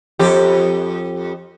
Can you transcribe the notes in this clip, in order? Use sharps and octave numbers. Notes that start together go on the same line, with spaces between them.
F2 G4